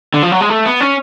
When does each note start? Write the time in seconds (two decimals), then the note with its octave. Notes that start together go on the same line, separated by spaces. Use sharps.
0.14 D3
0.23 F3
0.32 F#3
0.41 G#3
0.50 A3
0.66 B3
0.81 C#4